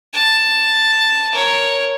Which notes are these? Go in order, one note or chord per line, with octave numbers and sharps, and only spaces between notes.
A5
A#4 C#5